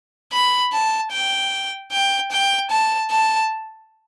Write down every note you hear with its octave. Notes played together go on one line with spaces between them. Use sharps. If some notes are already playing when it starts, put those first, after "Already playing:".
B5
A5
G5
G5
G5
A5
A5